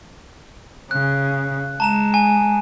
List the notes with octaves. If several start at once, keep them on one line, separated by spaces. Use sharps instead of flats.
C#3 F#6
G#3 A5 A#5 E7
G#5